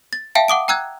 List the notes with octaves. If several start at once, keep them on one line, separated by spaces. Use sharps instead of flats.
A6
E5 F5 G5 A5
F#5 D6 D#6 D7
G5 A#5 E6 F#6 G#6